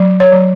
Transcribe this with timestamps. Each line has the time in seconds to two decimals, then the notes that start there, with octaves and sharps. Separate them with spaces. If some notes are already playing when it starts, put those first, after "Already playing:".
Already playing: F#3
0.20 C#5
0.32 F#3